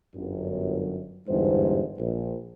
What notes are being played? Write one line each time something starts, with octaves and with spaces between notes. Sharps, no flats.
G1 F#2
G1 E2 G#2 G3 C5
A#1